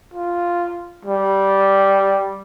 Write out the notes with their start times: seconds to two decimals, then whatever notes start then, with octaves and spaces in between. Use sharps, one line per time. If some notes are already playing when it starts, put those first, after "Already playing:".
0.14 F4
1.05 G3